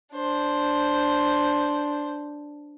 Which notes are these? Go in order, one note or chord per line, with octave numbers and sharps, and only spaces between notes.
D4 C5